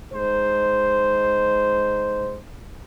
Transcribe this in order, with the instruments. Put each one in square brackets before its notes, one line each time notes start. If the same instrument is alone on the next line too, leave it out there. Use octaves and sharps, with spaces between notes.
[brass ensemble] G#3 D#4 C5